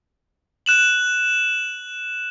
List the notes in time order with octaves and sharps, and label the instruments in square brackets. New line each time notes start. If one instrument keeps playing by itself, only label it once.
[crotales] F#6 E7 F#7